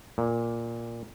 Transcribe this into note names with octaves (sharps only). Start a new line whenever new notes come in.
A#2